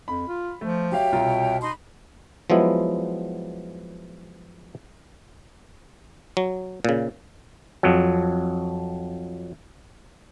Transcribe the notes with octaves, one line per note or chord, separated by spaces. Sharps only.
F2 B5
F4
F3 A3
F#3 G4 C#5 E5 F5 G5
C2 B2 F4 A#5
D#4 B5 C6
F3 F#3 G#3 B3 E4
F#3
A#2 C#3
F2 F#3